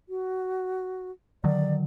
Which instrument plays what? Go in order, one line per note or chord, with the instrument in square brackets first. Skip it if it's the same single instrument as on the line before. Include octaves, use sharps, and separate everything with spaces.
[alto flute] F#4
[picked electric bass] D3 D#3 F#3 [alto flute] D5